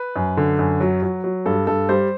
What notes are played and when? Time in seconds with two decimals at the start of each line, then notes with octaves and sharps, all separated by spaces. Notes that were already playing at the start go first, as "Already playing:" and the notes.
Already playing: B4
0.16 F#2
0.37 D3
0.59 F#2
0.80 F#3
1.02 F#3
1.24 F#3
1.46 G2 A4
1.67 G2 A4
1.89 G3 C5